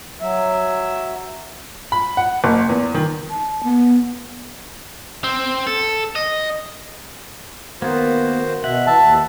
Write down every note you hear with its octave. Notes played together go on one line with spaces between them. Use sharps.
F#3 E5
B5
F#5
F#1
E2
D#3
A5
B3
C4
A4
D#5
D#3 A#3 B3 F#4 C5
B2 E5 F#5
E3 E5 A5
D#2